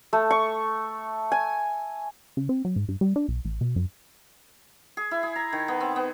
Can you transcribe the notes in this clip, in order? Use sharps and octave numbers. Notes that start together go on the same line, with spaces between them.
A3
C#6
G#5
C#3
C4
F#3
G#2
G2
G3
D4
B1
A1
B2
F#2
G#4
E4
G#4
A#5
D#3
B3
C4
B3